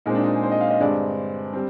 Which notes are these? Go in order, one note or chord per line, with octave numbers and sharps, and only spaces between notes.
A#2 G#3 C4 D#4
D4
D#4
G#4
C5
D#5
F5
D#5
G2 D3 G#3 C4 D5
G3 C4